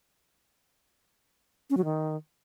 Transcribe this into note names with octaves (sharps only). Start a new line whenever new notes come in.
C#4
F#3
D#3